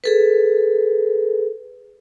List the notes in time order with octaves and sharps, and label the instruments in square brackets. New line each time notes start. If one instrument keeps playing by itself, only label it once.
[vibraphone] G#4 A4 B4